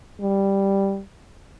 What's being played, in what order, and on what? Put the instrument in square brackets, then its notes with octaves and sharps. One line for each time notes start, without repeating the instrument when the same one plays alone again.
[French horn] G3